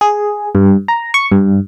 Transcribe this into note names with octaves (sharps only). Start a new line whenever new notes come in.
G#4
G2
A#5
C#6
G2